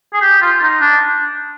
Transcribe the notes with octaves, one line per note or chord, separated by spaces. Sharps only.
G#4
G4
F4
D#4
D4